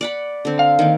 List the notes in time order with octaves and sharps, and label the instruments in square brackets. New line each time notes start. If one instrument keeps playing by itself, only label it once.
[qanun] D5 F#5 B5
D3 C4
[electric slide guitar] F5
[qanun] D#3 A#3